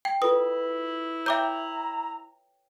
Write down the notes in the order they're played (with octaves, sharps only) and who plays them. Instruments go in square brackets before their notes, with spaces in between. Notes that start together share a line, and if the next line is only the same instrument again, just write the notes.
[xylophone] G5
[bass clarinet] E4 [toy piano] F4 A4 B4 [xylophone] D#6
[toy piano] C#5 G5 [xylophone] E5 D6 G6 [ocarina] A#5